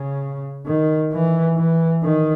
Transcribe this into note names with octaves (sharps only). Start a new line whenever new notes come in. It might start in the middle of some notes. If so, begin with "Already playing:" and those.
Already playing: C#3
D#3
E3
E3
D#3